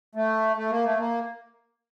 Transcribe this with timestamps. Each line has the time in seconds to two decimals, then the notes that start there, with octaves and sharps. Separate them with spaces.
0.15 A3
0.56 A3
0.70 A#3
0.84 A3
0.98 A#3